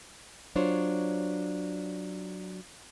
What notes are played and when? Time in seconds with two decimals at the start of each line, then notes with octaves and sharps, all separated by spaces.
0.56 F#3 D4 F4 C5 C#5